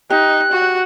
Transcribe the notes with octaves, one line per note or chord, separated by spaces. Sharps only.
D#4 G4 F#6
F#4